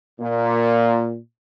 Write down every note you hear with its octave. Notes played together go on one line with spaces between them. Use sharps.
A#2